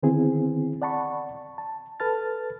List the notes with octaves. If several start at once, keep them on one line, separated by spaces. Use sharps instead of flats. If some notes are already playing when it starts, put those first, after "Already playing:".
D3 D#3 B3 C4 E4 G#4
D5 F#5 A5 B5 C#6
A5
A4 B4 A5 F6 A6